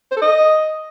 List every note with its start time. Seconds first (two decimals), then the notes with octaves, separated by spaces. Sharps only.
0.11 C5
0.16 A4
0.22 D#5